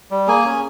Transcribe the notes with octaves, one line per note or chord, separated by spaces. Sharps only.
G3
A#3 G#4 G#5
C#4